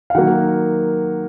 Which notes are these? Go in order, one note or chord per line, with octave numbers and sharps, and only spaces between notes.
F5
D#3 F#3 A#3 F#5